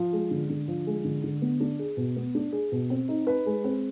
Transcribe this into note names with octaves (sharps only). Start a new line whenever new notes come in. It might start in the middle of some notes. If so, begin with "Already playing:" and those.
Already playing: F3
G#3
D3
D3
F3
G#3
D3
D3
B3
D4
G#4
B2
B3
D4
G#4
B2
C4
D#4
B4
G#3
C4